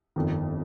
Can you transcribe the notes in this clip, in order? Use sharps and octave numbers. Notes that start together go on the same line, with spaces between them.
G1 F2 D#3